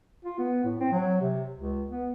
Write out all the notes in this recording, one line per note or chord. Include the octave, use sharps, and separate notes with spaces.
F4
B3
A2
C4
F#3
C3
C#2
B3